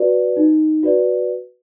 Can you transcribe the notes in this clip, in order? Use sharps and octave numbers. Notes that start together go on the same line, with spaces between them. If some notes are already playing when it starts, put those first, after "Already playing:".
Already playing: F#4 B4 D5
D#4
F#4 B4 D5